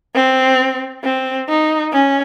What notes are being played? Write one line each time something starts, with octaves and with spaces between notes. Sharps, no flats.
C4
C4
D#4
C#4